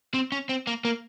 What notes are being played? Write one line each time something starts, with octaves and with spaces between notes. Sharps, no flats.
C4
C#4
C4
A#3
A#3